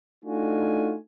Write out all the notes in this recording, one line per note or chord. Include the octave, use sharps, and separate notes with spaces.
A3 D4 D#4 F4 F#4 G#5